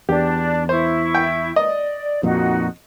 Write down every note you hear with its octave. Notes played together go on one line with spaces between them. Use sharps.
E2 D4 G4
E4 C5 C#6
G5
D5 D#5
F2 A#2 D#4 F#4